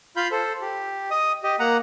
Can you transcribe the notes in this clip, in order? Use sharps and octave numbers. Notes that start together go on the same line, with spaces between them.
F4 F5 B5 G6
A4 C5
G4
D#5 D#6
G4 D#5
A#3 F#5 A#5